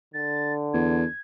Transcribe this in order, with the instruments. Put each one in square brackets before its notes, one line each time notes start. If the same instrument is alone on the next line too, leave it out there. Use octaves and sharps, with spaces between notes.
[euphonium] D3 [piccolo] A6
[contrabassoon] E2 [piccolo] G#6